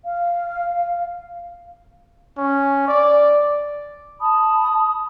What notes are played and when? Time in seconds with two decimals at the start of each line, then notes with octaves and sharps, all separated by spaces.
0.05 F5
2.38 C#4
2.88 D5
4.20 A5 B5 D#6